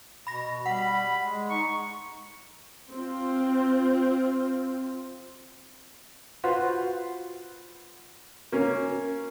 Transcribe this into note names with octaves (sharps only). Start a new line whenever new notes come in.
B2 B5 A#6
G3 F#5 B5
G#3
D#4 C#6
C4 F4
F4 F#4 B4 C5
A#3 C#4